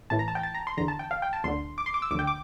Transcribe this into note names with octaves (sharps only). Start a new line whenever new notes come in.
A1 A2 E3 A5
A#5
A5
G5
A5
A#5
C6
E2 D3 A#5
A5
G5
F5
G5
A5
D2 D3 C6
D6
C6
D6
E6
D2 D3 G5 D6
D6